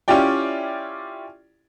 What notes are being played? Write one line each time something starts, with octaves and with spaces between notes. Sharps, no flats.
C#4 E4 F4 G4 D5 G5